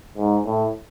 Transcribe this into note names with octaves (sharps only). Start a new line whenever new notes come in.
G#2
A2